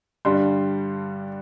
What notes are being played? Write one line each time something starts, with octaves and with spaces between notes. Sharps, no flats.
G2 D3 G3 C6